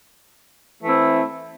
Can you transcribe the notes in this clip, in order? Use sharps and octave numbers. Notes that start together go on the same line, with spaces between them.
E3 A3 C4 E4